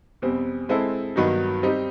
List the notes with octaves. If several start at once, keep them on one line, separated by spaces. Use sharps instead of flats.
E2 B2 G3 C4
G#3 C4 E4 A4
G2 D#3 F#3 B3 D#4
G3 C4 D#4 G4